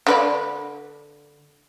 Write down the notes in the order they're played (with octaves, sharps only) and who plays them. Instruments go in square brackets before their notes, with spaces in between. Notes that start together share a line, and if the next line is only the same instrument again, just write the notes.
[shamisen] D3 B4 D5